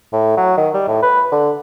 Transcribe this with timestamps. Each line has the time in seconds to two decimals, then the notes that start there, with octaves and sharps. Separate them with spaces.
0.13 A2
0.37 F#3
0.57 D#3
0.74 G3
0.88 A2
1.02 B4
1.32 D3